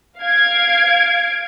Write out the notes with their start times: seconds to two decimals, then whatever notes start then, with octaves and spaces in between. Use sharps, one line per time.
0.20 F5 G#6 D7